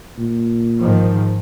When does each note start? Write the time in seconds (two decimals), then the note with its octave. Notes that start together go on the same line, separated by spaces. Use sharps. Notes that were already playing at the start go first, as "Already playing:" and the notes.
0.18 A#2
0.79 G#2 D#3 F3